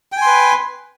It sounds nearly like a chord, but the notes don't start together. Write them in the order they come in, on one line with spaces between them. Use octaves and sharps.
G5 G#5 C6 B4